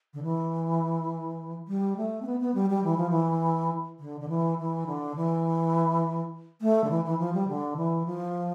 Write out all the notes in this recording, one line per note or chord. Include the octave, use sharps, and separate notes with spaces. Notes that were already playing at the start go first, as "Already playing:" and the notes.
D3
E3
G3
A3
C4
B3
B3
G3
G3
E3
F3
E3
D3
D3
E3
E3
D3
E3
A3
D3
E3
E3
F3
G3
D3
E3
F3